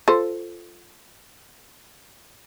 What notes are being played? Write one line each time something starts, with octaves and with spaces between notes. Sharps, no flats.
F4 A4 C5